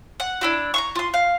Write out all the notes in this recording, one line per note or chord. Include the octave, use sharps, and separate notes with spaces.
F#5
D4 E4 F#4
A#5 C6 C#6
F4 C6
F5